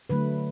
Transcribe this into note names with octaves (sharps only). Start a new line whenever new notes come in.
D3 F#3 A3 B4